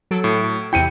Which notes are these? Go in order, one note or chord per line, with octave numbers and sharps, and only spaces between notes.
F#3 A4 D7
A2
E2 C3 E4 G5 C#7 D#7